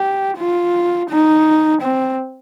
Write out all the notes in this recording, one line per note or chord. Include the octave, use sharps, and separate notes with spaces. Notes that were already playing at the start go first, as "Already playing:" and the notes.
Already playing: G4
F4
D#4
C4